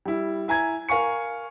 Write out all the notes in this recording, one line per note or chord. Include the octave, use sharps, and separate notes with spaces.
G3 E4
E4 G#5 A#5 G#6
A#4 F5 G#5 C#6 C#7